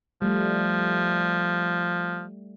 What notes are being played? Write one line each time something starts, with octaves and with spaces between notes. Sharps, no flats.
F3 G3 A3